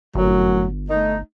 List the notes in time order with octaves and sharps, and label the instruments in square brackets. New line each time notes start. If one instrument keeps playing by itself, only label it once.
[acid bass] G1 [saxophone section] F#2 A2 F#3
[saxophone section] A3 D#4